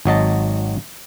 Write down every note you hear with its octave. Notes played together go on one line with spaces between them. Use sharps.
G#1 F#3 D#5 A5